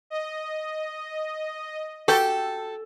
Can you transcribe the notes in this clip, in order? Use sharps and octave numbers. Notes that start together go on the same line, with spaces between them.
D#5
F#4 G4 A4 G5